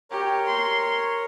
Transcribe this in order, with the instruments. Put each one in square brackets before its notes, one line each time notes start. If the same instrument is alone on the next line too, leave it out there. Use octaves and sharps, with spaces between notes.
[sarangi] G4 [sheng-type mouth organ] A#4 C#5
[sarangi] C6